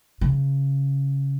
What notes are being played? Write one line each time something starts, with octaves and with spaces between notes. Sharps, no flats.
C#3